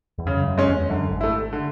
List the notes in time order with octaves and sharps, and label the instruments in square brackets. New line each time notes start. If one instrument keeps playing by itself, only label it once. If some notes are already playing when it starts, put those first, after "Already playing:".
[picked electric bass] E2
[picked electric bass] F#2 [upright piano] C#3
[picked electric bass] G#2
F#2
[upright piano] G#3 C#4
[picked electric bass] E2
[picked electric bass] F#2 [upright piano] D3
[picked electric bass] G#1 G#2
[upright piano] A3 E4
D3